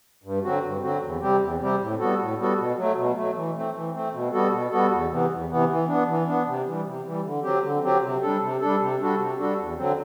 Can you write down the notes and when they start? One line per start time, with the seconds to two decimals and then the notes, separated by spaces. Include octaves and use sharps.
0.24 G2
0.43 D3 F#3 C4 F#4
0.63 G2
0.83 D3 F#3 C4 F#4
1.02 E2
1.21 C3 G3 C4 G4
1.41 E2
1.60 C3 G3 C4 G4
1.80 A2
1.99 G3 B3 F#4 A4
2.19 A2
2.38 G3 B3 F#4 A4
2.57 B2
2.77 F#3 A3
2.96 B2
3.16 F#3 A3
3.35 E3
3.55 A3 C4
3.75 E3
3.94 A3 C4
4.13 B2
4.32 G3 B3 F#4 A4
4.52 B2
4.71 G3 B3 F#4 A4
4.91 E2
5.10 C3 E3 B3
5.30 E2
5.49 C3 E3 B3
5.69 E3
5.88 B3 D4
6.08 E3
6.27 B3 D4
6.47 C3
6.65 E3 G3
6.86 C3
7.05 E3 G3
7.24 D3
7.43 F#3 C4 G4
7.63 D3
7.83 F#3 C4 G4
8.02 C3
8.22 G3 D4 A4
8.41 C3
8.61 G3 D4 A4
8.80 C3
8.99 G3 D4 F#4 A4
9.19 C3
9.39 G3 D4 F#4 A4
9.58 E2
9.77 D3 F#3 C4